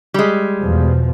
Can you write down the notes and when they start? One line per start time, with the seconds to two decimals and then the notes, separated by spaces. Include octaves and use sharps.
0.14 G3 G#3
0.63 E2 B2 F3